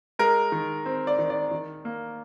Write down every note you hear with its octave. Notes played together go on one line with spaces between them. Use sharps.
G#3 A#4
D#3
C4
D5
D#3
D5
D#3
A#3